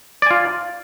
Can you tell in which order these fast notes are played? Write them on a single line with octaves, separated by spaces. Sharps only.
D5 G#5 F4